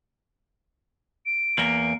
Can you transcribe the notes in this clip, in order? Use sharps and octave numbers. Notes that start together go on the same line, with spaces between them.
D7
E2 A#3